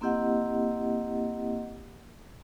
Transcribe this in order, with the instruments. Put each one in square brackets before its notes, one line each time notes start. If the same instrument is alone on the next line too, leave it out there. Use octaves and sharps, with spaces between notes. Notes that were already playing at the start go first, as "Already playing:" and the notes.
[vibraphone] A#3 C4 E4 G4 D#5 F#5